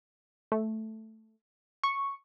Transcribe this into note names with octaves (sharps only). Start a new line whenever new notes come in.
A3
C#6